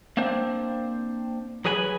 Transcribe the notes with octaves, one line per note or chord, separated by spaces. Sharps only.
A#3 C4 D4 C5
F#3 G#4 B4 G#5 A5 B5